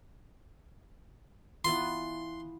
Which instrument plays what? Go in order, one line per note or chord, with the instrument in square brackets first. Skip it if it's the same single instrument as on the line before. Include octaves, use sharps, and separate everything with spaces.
[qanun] E3 B3 F4 [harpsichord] C6